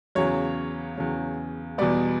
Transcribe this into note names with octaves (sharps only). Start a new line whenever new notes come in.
E2 C#3 F#3 C#5
E2 C#3 F#3
E2 B2 G3 B3 D5